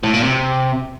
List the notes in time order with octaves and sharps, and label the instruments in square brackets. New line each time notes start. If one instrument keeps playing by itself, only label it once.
[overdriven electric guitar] A2
A#2
C3